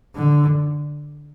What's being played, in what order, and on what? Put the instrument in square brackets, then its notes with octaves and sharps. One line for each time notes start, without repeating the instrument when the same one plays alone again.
[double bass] D3